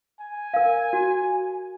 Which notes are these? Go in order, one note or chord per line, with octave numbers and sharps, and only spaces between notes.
G#5
A#4 F5
F#4